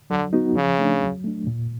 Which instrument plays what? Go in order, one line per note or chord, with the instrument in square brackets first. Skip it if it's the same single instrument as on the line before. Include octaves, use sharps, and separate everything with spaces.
[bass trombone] D3 [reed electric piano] F#3
[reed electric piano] B3 D#4 F#4
[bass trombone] C#3 [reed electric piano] F3
[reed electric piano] A3 D4
F#3
A3 D4
A#2